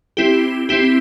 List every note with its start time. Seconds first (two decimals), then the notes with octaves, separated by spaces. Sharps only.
0.17 C4 E4 G4
0.69 C4 E4 G4